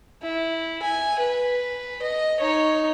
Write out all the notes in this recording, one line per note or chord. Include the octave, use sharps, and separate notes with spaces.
E4
G#5
B4
D#5
D#4 C#5